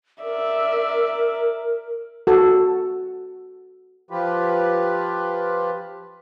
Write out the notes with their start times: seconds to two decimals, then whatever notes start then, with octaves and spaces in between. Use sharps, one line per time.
0.23 A#4 D5 E5
2.27 F#4 A4
4.11 F3 F4 G4 B4